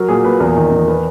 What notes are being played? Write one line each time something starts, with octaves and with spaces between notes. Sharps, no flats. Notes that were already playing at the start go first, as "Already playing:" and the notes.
Already playing: F#3 A#4
A#2 G#4
A#2 B4
E2 A#4
D#3
E2
B4